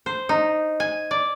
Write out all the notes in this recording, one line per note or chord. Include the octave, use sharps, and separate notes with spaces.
C5
D#4
G#5
D5